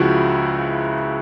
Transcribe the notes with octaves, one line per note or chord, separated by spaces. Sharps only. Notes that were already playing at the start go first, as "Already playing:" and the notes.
Already playing: C#2 C#3 F3 E4 F#4